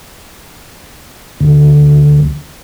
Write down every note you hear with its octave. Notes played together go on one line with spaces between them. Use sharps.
D2